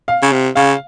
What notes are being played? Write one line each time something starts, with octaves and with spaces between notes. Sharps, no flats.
F5
C#3
C3
C#3 F5